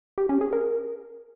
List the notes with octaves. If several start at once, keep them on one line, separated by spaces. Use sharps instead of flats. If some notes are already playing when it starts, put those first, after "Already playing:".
G4
C#4
G#4
A#4